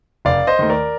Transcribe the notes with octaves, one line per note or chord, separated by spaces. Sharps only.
F1 D5 F5
C5 D#5
D#2 D#3 A3
A#4 D5